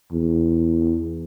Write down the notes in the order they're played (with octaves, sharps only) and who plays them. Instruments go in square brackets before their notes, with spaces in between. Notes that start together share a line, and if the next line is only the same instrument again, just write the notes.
[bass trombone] E2